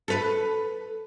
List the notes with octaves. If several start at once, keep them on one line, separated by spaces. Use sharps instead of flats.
A4 B4